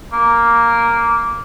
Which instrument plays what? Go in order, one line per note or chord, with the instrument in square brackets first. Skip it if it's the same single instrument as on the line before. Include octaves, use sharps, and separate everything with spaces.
[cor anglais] A#3